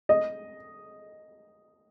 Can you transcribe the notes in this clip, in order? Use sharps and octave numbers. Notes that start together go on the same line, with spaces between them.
D#5